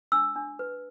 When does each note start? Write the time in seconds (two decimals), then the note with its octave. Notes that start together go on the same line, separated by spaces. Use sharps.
0.12 D4 E6
0.36 D4
0.59 B4